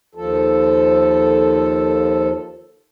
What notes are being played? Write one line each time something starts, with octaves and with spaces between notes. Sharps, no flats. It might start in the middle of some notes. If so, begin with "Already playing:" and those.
D#2 F3 A4